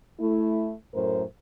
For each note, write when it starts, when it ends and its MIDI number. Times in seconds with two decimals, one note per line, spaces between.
0.20 0.74 57
0.20 0.74 64
0.94 1.24 42
0.94 1.24 45
0.94 1.24 70
0.94 1.24 72